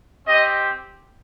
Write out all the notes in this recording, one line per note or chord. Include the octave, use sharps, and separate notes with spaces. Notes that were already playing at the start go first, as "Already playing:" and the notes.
C4 G4 D#5